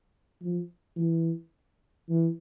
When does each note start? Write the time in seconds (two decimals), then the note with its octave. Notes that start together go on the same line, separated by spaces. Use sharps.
0.41 F3
0.96 E3
2.09 E3